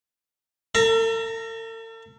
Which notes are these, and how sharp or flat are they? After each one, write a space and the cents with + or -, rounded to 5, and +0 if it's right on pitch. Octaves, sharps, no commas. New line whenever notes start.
A4 +45 E5 +40 A#5 +0